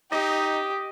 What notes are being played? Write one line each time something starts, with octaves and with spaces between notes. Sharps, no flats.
D#4 G4 D#5